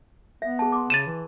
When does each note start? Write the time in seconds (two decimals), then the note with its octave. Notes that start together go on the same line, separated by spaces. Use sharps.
0.42 B3 E5
0.59 G#4 A5
0.72 C6 D6
0.90 C#3 A6 D#7 E7
1.07 E3